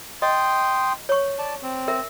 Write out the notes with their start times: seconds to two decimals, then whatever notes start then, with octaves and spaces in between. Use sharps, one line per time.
0.22 D#5 G5 C6 D#6
1.09 C#5 C#6
1.39 D5 A5
1.63 C4
1.88 A#4 E5